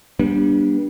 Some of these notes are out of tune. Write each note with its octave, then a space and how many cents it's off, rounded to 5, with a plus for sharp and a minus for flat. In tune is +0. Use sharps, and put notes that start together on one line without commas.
G3 +0 B3 -45 D4 -5